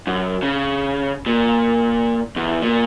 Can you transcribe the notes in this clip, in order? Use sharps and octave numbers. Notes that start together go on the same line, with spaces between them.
F#2
C#3
A#2
E2
A#2